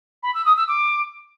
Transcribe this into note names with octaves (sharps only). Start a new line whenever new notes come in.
B5
E6
D#6
E6
D6